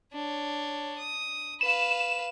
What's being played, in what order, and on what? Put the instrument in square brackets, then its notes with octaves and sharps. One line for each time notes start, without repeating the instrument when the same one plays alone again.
[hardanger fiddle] D4 C#5
D#6
[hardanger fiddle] B4 F5 [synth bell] E7